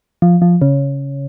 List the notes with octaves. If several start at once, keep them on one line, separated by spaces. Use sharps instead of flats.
F3
F3
C#3